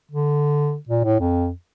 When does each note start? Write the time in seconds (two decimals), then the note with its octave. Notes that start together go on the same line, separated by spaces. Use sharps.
0.12 D3
0.89 A#2
1.04 A2
1.20 F2